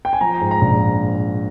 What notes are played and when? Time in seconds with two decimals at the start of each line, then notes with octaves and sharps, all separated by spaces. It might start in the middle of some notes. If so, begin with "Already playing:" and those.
0.05 G5
0.13 G#5
0.21 F3 A#5
0.41 G#2
0.51 A#5
0.61 A#1